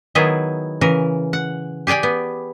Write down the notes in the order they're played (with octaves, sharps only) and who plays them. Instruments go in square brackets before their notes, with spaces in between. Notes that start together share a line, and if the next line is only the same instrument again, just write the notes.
[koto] D#3 F#3 B3 E4 G#4
C#3 E3 A#4
F#5
G4 G#4 D5 G5 G#5
B3